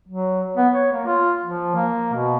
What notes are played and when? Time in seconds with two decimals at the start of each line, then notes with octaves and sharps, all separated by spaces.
0.08 F#3
0.57 B3
0.74 C#5
0.92 A#3
1.06 F4
1.45 F3
1.75 A#3
2.13 B2